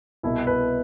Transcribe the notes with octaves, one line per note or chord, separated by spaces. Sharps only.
C2 B2 E4
B4